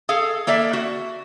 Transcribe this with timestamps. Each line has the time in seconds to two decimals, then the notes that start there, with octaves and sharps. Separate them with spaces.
0.09 G#4 A4 F5
0.47 A#3 A4 D5 E5
0.73 F#4